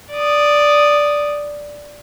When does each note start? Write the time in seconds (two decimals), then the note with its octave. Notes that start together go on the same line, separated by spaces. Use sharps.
0.13 D5 D#6